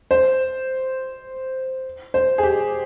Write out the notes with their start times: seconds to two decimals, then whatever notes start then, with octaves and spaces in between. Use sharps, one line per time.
0.11 C5
2.14 C5
2.38 G#4
2.43 G4